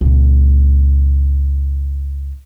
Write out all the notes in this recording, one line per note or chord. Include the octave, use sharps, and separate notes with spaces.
C#2 A#2